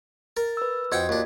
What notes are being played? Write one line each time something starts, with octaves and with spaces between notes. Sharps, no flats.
A#4 A6
B4 E6
F2 F#4 D#5 F#5 G5 G#6
D#2 D4 F4